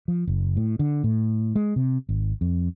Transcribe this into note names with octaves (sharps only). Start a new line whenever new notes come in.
F3
F#1
A2
D3
A2
G#3
C3
G#1
F2